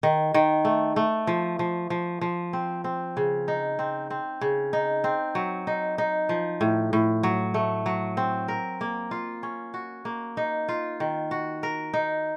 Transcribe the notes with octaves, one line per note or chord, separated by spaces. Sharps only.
D#3
D#3
A3
A3
F3
F3
F3
F3
C4
C4
C#3
D#4
C4
C4
C#3
D#4
C4
F#3
D#4
D#4
F3
A2
A2
F#3
A3
F#3
C4
A#4
A#3
F4
C#4
F#4
A#3
D#4
F4
D#3
F#4
A#4
D#4